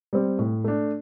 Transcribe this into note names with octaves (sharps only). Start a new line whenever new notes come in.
G3 C4
A2
A3 D4